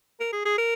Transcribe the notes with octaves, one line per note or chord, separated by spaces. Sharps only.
A#4
G#4
G#4
A#4